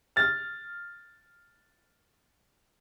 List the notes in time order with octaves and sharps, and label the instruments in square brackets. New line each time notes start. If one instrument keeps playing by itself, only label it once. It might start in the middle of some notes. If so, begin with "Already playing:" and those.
[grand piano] F6 A6